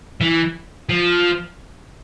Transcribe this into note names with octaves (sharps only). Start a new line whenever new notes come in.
E3
F3